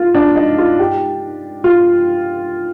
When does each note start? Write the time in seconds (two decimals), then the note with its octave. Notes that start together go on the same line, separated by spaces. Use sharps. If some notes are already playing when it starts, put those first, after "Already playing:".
Already playing: F4
0.15 D4
0.36 D#4
0.58 F4
0.79 G4
1.64 F4